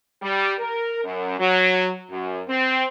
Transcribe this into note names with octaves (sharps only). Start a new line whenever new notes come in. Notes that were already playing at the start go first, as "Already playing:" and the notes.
G3
A#4
F#2
F#3
F#2
C4